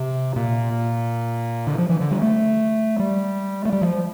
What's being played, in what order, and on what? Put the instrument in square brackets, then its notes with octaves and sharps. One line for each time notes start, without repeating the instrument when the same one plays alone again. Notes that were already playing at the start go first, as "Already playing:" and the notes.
Already playing: [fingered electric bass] C3
A#2
D3
F3
E3
D3
G3
A3
G3
A3
G3
F3